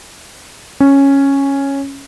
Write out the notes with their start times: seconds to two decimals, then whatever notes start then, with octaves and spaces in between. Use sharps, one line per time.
0.80 C#4